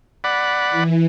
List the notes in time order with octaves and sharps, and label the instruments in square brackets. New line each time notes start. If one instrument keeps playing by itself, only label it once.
[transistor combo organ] D5 F#5 B5
[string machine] E3